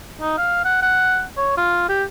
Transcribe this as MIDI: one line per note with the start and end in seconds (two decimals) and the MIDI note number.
0.21 0.36 63
0.38 0.61 77
0.65 0.81 78
0.82 1.23 78
1.37 1.56 73
1.57 1.86 65
1.89 2.04 67